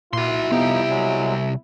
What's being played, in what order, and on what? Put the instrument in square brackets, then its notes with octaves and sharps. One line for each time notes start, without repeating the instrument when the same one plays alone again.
[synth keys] A#2 [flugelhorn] E4 [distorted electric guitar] F#4 C6
[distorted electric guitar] C2 G4 [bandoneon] F2 F3 D#4 [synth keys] B3
[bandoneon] F#3 G#3